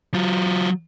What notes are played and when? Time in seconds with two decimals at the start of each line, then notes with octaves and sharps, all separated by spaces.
0.14 F#3 F4